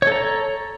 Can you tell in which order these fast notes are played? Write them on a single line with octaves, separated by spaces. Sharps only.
C#5 A4 A#5